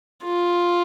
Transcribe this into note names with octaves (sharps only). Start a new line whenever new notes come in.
F4